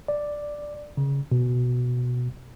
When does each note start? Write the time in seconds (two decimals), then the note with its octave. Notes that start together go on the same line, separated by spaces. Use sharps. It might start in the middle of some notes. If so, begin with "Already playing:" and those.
0.08 D5
0.97 C#3
1.32 B2